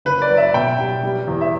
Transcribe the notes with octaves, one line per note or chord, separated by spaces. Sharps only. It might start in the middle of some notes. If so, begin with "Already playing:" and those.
F#1 B4
D5
F#3
E5
B2 G5
G3
G3
E2
E5